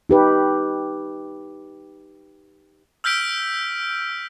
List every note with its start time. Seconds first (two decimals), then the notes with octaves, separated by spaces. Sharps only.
0.09 D#4 G4 B4
3.04 E6 F6 G6 B6 D7